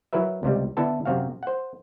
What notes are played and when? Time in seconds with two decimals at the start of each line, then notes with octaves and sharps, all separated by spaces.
0.13 F#3 E4 A#4 B4 E5
0.43 C#2 C3 G3
0.77 D3 B3 E4 A4 E5 A5
1.05 F#2 C3 C4 F#4 F5
1.43 C5 F#5